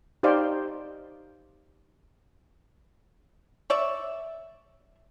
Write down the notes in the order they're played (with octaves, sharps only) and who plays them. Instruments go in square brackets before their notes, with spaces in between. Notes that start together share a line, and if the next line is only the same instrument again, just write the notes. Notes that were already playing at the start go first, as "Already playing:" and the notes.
[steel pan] D#4 G4 C5 D5 F5 C6
[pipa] C#5 D5 E5